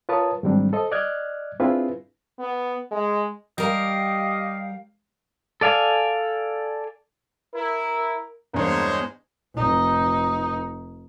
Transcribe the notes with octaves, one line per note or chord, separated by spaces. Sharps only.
F4 A#4 B4 C#5 A5 D#6
G#2 D#3 F#3 G3 C4 D4
A4 C5 D#5
D5 D#5 F6 F#6 G#6
C4 D4 E4 F4 G#4 B4
B3
G#3
G3 G4 A#4 D#5 F5
A4 D5 F5 G#5
E4 A#4
E2 G2 G#3 A#3 C5 C#5
F1 D#4